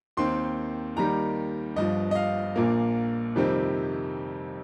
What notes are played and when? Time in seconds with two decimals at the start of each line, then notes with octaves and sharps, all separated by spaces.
0.17 D#2 D#3 C4 C6
0.96 D#2 D#3 G3 A#5
1.76 G1 G2 F3 D#5
2.11 D#5
2.15 F5
2.56 A#1 A#2 A#3
3.36 F2 C3 D#3 G3 C4